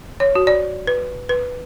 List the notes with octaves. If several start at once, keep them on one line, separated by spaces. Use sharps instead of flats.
C#5
F#4
D5
B4
B4